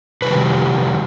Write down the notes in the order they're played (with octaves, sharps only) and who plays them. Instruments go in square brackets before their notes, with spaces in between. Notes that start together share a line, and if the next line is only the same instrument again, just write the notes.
[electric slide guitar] C3 D#3 G3 B4